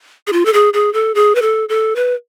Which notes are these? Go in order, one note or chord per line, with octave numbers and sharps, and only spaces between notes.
G#4
F4
A4
G#4
G#4
A4
G#4
B4
A4
A4
B4